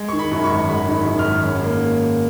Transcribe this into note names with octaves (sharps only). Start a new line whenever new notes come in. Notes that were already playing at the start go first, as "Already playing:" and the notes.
Already playing: G#3
D#3 C#6
B5
F#2
C#6
G#1
G#3 B5
D#3
F#2
F6
G#1
C#4
A#3